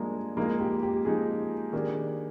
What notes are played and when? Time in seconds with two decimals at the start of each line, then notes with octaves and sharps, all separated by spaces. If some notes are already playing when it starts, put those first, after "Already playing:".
Already playing: F3 G3 G#3 A#3 D4
0.37 F3 G#3 A#3 D#4
0.60 G4
0.83 G4
1.05 F3 G#3 D#4 G#4
1.72 D#3 A#3 D4 G4 G#4